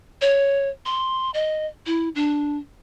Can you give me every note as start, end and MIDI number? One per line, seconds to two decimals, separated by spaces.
0.22 0.69 73
0.86 1.31 84
1.34 1.66 75
1.86 2.09 64
2.15 2.57 62